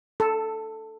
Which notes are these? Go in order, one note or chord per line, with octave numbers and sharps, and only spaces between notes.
A4